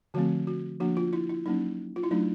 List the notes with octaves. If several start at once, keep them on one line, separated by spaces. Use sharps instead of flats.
D3 F3 A3 C4 F#4
F#4
F3 A#3 D4 F#4
F4
E4
E4
F#3 A#3 C#4 D#4
F4
E4
F#3 A3 D4 D#4